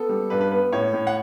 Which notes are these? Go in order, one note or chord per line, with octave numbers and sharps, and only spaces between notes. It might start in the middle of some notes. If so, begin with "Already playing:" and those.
Already playing: B3 A4
G3
G2 B4
B4
B3 B4
A2 C#5
A2
F#5